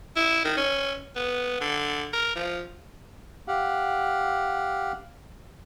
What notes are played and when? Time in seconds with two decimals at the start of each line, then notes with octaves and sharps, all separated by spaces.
0.16 E4
0.45 D#3
0.57 C#4
1.16 B3
1.61 D3
2.13 A#4
2.36 F3
3.48 G4 F5 F#5